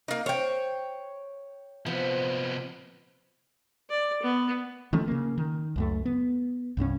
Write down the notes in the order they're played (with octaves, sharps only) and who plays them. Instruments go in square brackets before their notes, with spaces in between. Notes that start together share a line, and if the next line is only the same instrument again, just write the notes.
[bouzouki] A#3 D#4
[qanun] C5 [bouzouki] C#5 G5
[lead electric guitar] C3 B3 [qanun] F3
[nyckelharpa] D5
B3
[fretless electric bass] D#3 F3 A3 C#4
C#3 A#3
D#3
C#2 F#2 A3
B3
C2 G2 G3 C#4